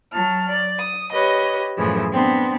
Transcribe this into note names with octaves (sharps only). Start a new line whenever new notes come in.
F#3 A5 F6
D5
D#6
G4 B4 C#5 D#5
F#2 A2 C#3 E3 F3
B3 C4 D4